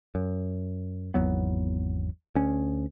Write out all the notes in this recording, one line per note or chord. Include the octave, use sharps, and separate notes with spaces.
F#2
G#1 E2 F#3 B3
D2 C#4